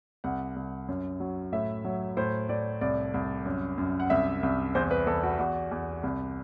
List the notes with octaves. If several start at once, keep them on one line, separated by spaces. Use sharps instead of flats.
C2 F#5
C2
F#2
F#3
A2 E5
F#3
A2 C5
A2 D5
C2 D5
C2
F#2
F#2
F#5
C2 E5
C2
E2 C5
B4
E2 A4
F#4
E2 F#4
E2
C2